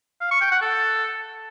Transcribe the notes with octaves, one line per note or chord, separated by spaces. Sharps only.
F5
C#6
G5
F#5
A4